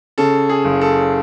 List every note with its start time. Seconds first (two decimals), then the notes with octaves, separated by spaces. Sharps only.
0.18 C#3 A4
0.49 G#4
0.65 F#1
0.81 A4